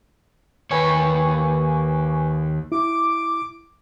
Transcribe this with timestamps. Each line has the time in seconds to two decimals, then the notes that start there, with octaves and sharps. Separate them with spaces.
0.71 D#2 B4 C#5 G#5 C#6
2.72 E4 D6